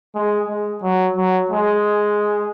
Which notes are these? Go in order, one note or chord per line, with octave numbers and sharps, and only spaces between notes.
G#3
G#3
F#3
F#3
G#3